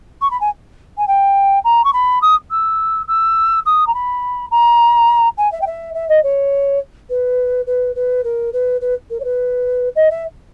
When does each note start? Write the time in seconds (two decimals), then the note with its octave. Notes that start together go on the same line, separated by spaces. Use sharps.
0.22 C#6
0.31 B5
0.41 G#5
0.98 G#5
1.08 G5
1.64 A#5
1.84 C#6
1.93 B5
2.22 D#6
2.51 E6
3.08 E6
3.66 D#6
3.87 A#5
3.94 B5
4.51 A#5
5.38 G#5
5.52 E5
5.61 G5
5.67 E5
5.94 E5
6.09 D#5
6.23 C#5
7.10 B4
7.67 B4
7.96 B4
8.24 A#4
8.53 B4
8.81 B4
9.10 A#4
9.20 C#5
9.24 B4
9.96 D#5
10.11 E5